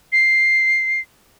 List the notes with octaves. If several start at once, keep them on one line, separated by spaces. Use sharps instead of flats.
C7